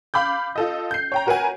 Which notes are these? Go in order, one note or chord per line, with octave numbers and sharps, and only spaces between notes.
F5 B5 D6 G6
F4 A4 D#5
G6 C7
C#5 G5 A#5
C#4 F#4 A#4 B4 F#5 G#5